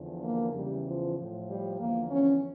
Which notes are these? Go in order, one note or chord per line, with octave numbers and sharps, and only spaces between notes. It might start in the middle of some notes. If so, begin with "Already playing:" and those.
Already playing: E2 D3 F3
A#3
E2 C#3 E3 G3
F3
A2 F3
G3
E2 D3 F3 A#3
C#4